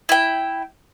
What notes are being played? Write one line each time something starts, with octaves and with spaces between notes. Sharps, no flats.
E4 G5